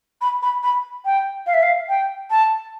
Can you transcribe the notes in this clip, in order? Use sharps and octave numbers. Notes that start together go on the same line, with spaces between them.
B5
B5
B5
G5
F5
E5
F5
G5
A5